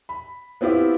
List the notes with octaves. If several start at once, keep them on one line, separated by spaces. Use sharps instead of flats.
B5
B3 C4 E4 F4 G4